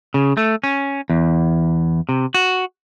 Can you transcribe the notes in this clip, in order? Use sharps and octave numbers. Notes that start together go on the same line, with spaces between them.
C#3
A3
C#4
E2
C3
F#4